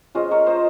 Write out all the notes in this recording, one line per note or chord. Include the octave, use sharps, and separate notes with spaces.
G#3 C#4 F4 C5 D#5
A#4 C#5
C5 D#5